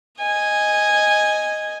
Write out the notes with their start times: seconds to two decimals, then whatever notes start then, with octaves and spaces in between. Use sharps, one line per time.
0.21 D#5 G#5